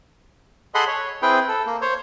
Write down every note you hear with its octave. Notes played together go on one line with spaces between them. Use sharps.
G#4 A4 D#5 F#5 B5 C6
C#5
C4 E4 G#4 B4 G5
A4
A#3
C5 C#5